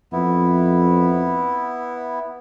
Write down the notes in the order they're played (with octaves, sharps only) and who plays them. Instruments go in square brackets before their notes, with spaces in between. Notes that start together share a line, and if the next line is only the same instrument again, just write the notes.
[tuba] F2 [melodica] B3 E4